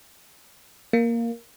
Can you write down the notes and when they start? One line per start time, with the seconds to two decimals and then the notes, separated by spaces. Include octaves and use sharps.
0.93 A#3